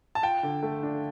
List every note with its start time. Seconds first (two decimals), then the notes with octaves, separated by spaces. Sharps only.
0.15 A5
0.23 F4 G5
0.43 D3
0.63 A3
0.83 D4